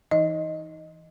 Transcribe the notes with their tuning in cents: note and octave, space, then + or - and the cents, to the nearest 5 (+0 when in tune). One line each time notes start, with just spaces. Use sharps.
E3 +0 D#4 +20 D#5 +0